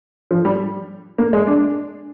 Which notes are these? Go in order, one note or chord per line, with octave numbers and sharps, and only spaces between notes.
F3
G3
A#3
G#3
D4